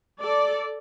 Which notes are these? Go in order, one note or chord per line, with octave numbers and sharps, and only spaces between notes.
A4 D5